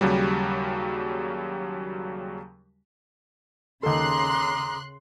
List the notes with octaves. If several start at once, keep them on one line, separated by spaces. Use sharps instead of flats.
D#2 C#3 F#3 G3
D#2 C#3 A4 A#5 C6 D6 D#6 F#6